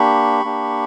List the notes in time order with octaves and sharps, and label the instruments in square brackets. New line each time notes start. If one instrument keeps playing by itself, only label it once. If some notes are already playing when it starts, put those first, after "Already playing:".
Already playing: [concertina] A#3 D4 G4 B5 C#6
A#3 D4 G4